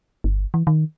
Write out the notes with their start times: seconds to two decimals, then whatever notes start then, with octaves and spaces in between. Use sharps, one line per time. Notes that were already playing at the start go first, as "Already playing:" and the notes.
0.24 G1
0.54 E3
0.67 D#3